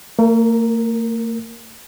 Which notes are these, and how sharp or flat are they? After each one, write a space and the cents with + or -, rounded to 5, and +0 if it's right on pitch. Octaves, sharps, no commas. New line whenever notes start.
A#3 -45 A#4 +0